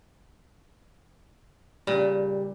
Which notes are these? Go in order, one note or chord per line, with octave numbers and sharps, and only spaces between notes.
A#2 C#3 G3